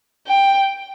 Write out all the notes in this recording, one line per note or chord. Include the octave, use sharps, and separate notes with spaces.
G5